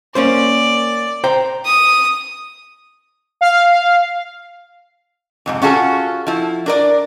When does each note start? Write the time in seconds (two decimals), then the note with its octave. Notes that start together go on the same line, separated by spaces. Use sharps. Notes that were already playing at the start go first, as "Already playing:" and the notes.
0.15 A#3 C#4 C5 D5
1.24 C5 G5 A#5
1.65 D#6
3.41 F5
5.46 F2 G#2 C3
5.62 C#4 F4 F#4 G#4 A4
6.27 F3 E4
6.66 D4 A#4 D5